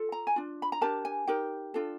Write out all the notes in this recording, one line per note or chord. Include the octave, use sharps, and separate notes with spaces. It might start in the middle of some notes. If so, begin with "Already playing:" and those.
Already playing: F4 A4
A#5
G#5
D4 F4
B5
A#5
D4 G4 A#4 A5
G#5
D#4 G4 A#4 G5
D4 F4 A4